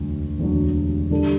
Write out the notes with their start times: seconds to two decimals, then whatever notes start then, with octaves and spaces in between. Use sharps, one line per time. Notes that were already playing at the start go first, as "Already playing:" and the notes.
Already playing: E1 D2 D3 F#3
0.38 E1 D2 D3 F#3
1.10 D3 G3 D4 A4